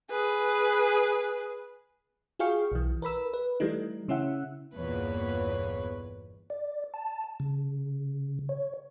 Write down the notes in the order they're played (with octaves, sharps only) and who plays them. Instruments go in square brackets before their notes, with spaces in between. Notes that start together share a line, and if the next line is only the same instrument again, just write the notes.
[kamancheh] G#4 B4
[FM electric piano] F4 F#4 G#4 F5 G5 C#6
B1 E3
A#4 B4 B5 E6
B4
E3 G3 A3 D#4
C#3 C#4 E4 E5 F#5
[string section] G1 E2 A#2 B4 C#5
[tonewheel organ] D5
A5
C#3
C#5